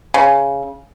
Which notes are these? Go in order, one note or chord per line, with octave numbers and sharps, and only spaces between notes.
C#3